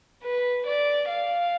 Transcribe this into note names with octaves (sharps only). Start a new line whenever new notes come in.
B4
D5
F5